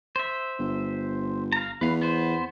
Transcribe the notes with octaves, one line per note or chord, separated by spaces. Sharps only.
C5 E5
G1
F5 A#5
E2 B4 F5
B3 C5